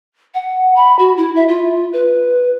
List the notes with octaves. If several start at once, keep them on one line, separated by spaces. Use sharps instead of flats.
F#5
B5
F#4
E4
E5
F4
B4